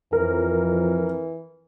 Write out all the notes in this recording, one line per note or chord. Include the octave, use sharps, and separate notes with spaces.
F2 E3 A#4